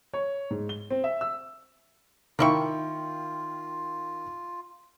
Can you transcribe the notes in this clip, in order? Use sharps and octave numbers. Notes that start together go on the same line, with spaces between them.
C#5
G#2
G7
C4
E5
E6
D#3 A#3 E4 F4 F5 G5 C#6